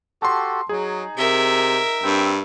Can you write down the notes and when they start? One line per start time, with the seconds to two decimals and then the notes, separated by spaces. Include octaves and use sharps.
0.22 F#4 G4 A4 A5 C6
0.69 F#3 D#4 G#4
1.17 C3 A#4 E5
2.03 G2 C4 G5 E6